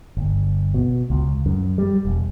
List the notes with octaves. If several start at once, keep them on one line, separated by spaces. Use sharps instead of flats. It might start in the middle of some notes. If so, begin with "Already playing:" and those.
G1
B2
C#2
F#2
G3
E1